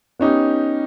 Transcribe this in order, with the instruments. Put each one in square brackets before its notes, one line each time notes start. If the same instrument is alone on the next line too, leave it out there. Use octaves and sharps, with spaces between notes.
[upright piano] B3 C#4 D#4 G4